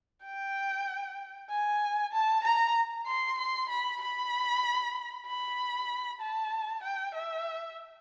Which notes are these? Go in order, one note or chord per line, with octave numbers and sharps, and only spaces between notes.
G5
G#5
A5
A#5
C6
C6
B5
B5
B5
A5
G5
E5